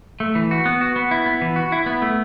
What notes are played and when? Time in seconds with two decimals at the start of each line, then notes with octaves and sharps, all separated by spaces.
0.20 A3
0.35 E3
0.51 F#4
0.66 B3
0.81 F#4
0.96 B3
1.11 E4
1.26 B3
1.42 E3
1.56 F#4
1.72 E4
1.86 B3
2.02 A3